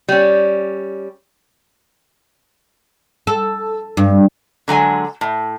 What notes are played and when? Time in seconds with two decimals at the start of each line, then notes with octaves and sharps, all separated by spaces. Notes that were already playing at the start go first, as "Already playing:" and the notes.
0.08 G3 C#4
3.27 A4
3.97 G2
4.68 D3 F#3 G#3 G#5
5.21 A2